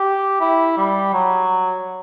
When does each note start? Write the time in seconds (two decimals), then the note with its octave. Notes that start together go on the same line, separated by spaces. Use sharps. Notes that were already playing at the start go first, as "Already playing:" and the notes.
Already playing: G4
0.41 E4
0.77 G3
1.13 F#3